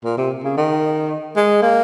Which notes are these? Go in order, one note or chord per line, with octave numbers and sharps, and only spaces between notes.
A#2
C3
C#3
D#3
G#3
A#3